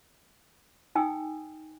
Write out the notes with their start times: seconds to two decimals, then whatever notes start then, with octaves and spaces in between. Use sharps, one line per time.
0.95 D#4 G5 G#5 D#6 E6